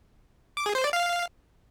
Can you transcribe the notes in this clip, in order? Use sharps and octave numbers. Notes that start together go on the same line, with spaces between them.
D6
G#4
C5
D5
F5